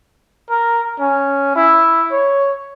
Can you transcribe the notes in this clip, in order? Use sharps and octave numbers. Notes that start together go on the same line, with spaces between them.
A#4
C#4
E4
C#5